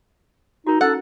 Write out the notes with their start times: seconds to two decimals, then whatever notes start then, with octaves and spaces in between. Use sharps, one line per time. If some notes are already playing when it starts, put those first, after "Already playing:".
0.67 D#4 F#4 A#4
0.81 C#4 D#4 A4 F#5